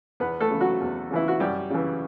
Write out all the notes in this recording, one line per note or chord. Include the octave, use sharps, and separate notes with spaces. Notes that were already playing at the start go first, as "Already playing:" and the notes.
E2 B3 B4
A3 A4
C#3 E3
F#3 F#4
E2
C#3 E3 E4
F#4
F#2 G3 G4
C#3 E3